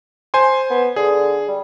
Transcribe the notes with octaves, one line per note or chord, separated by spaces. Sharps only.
C5 G#5 C6
B3
D3 G#4
G3